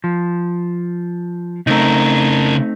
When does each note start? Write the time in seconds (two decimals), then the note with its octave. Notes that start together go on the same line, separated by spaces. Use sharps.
0.04 F3
1.67 C#3 A3 C4 D#4 A#4